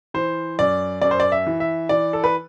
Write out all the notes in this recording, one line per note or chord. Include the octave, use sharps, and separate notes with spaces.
E3 C5
F#2 D5
F#2 D5
C5
D5
E5
E3
E5
E3 D5
A4
B4